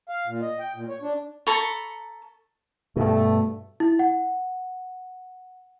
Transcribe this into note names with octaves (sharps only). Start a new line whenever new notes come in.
F5
A#2
D#5
G5
A#2
C#5
D4
A4 A#5 B5 C#6
G2 B2 A3
E4
F#5